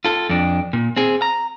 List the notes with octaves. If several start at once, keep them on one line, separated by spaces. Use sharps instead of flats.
F4 A4
F2 D4
A#2
C4 G#4
A#5